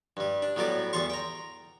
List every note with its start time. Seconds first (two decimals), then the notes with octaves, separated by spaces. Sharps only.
0.17 G2 G3
0.42 D4
0.56 A2 F#3 G3 B3 D5 D6
0.93 E2 G3 A5 C6 C#6
1.10 G5 A#5